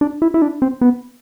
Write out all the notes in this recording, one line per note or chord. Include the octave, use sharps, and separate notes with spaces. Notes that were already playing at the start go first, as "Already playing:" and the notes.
D4
E4
E4
D4
C4
B3